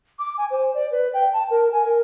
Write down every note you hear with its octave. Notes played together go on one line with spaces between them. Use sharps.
D6
G#5
C5
D5
B4
G5
A5
A#4
G#5
A#4